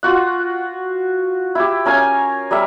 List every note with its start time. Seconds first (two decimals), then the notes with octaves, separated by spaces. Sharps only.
0.03 F4 F#4 F#5
1.55 E4 G4
1.85 C#4 A#4 F5 G#5
2.51 G3 A#4 E5